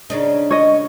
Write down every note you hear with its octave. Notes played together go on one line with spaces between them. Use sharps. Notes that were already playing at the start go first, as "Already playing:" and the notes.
C#3 D4 D#4
C#5 D#5